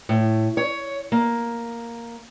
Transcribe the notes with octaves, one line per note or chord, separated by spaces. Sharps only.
A2
C#5
A#3